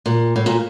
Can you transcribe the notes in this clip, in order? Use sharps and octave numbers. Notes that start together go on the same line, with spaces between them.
A#2
A2
A#2